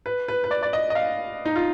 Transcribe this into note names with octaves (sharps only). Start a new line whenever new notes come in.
B4
B4
B4
D5
D5
D#5
D#5
F5
D#4
F4